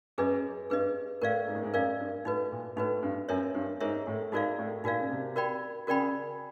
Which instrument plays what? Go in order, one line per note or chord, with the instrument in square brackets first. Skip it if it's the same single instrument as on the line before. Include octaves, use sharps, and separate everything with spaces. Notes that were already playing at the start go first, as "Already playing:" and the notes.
[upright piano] F#2 [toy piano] G#4 B4 D#5
[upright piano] G2 [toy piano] G#4 B4 D#5
[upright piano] A2 [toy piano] A#4 D5 F5
[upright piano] G#2
A2
G#2
[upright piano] F#2 [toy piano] A#4 D5 F5
[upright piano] G2
[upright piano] A2 [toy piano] D#4 F#4 B4
[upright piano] A#2
[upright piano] A2 [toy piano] D#4 F#4 B4
[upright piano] G2
[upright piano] F#2 [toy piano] A#4 C#5 E5
[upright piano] G2
[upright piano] G#2 [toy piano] A#4 C#5 E5
[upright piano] A2
[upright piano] G#2 [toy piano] D#4 F#4 A#4 D5 F5
[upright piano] A2
[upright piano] A#2 [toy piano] D#4 F#4 A#4 D5 F5
[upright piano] C#3
C3
[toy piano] F#4 A#4 D5 G5 B5
[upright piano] C#3 [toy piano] F#4 A#4 D5 G5 B5